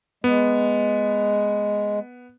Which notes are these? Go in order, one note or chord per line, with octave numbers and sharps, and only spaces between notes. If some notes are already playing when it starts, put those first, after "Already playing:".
G#3 B3